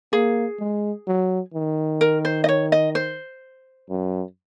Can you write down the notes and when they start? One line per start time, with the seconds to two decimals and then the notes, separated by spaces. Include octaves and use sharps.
0.13 A#3 G#4
0.59 G#3
1.07 F#3
1.54 D#3
2.01 A#4
2.25 C5
2.44 D#5
2.49 C#5
2.72 D#5
2.95 C5
3.90 F#2